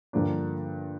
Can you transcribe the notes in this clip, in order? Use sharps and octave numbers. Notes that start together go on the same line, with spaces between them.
G2 D3 F3 A#3 D4